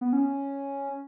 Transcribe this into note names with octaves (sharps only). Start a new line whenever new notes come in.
B3
C#4